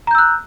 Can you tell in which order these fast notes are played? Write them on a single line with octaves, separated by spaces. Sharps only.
A#5 G6 E6 F#6